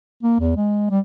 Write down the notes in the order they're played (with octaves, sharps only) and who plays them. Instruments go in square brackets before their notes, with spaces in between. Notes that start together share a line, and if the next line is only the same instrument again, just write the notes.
[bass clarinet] A#3
E2
G#3
G3